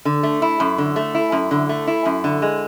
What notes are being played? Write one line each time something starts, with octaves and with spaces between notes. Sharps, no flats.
D3
A3
E4
F#2
D3
A3
E4
F#2
D3
A3
E4
F#2
D3
G#3